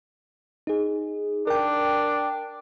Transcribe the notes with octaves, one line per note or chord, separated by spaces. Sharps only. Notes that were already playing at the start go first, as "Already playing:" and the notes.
D#4 G#4
D4 A#4 G5